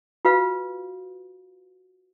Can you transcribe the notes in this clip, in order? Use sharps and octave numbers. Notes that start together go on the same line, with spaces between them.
F4 F#4 B4 F5